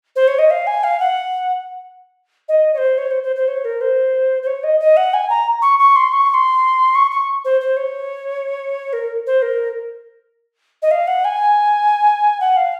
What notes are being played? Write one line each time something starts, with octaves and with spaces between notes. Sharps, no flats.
C5
C#5
D#5
F5
G#5
F5
F#5
D#5
C#5
C5
C#5
C5
C5
C5
C#5
A#4
C5
C5
C#5
D#5
D#5
F#5
G#5
A#5
C#6
C#6
C6
C#6
C#6
C6
C#6
C#6
C5
C5
C#5
A#4
C5
A#4
D#5
F5
F#5
G#5
F#5
F5